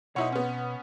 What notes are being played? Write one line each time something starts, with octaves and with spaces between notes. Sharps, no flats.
B2 D#4 E4 C#5 F#5 C6
B3 C#4